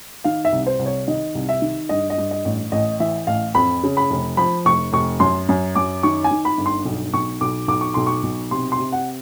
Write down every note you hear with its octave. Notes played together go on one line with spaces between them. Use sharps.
D#3 F5
E5
C2
C5
C2
C#5
D#3 D#5
C2
E5
D#3
G2 D#5
D#5
G2
D#5
A1
A1 D#5
E3 E5
A1 F5
F2 B5
C#3
B5
F1
F3 B5
F1 C#6
F1 C#6
F#2 C6
F#2
F#2 D6
D#3 C#6
G#5
D#3
B5
G1
C6
B1
B1 C#6
B1 D6
B1 D6
C#6
B1 C6
C#6
B1
C3 C6
C6
C3
F#5